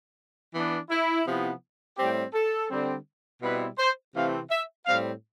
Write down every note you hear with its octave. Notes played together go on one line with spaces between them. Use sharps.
E3 B3 D4
E4
C3 F3 B3 E4
A2 G3 C4 G4
A4
D3 G3 C4
B2 G3 C4 E4 B4
C5
C3 E3 A3 C4 F5
E5
A2 G3 C4 F5